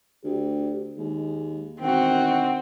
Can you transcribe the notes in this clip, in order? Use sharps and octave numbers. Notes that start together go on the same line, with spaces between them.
D2 G4
D#2 G#3
E1 D#3 C4 F#4